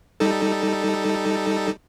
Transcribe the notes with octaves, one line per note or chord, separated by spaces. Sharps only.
G3 D#4 A4